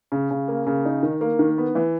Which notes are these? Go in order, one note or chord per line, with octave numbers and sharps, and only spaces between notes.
C#3
C#3
A#3
C#3
D#4
D#3
A#3
D#3
B3
E3